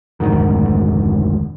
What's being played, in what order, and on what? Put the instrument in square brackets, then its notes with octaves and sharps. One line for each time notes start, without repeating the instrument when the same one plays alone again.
[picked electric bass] F1 D2 G#2 D#3